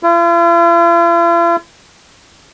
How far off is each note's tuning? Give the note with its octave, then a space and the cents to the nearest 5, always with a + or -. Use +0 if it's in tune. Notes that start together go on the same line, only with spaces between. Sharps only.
F4 -45